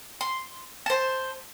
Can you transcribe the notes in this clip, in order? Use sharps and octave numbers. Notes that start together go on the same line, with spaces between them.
C6
C5 A5